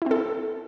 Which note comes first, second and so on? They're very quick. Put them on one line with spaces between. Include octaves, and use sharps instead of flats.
E4 C4 A4